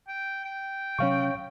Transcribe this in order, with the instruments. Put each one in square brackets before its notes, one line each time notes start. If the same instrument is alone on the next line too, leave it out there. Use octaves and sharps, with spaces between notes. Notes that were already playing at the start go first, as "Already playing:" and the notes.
[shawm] G5
G5
[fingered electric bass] C3 F#3 C#4 [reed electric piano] C#5 F5 C#6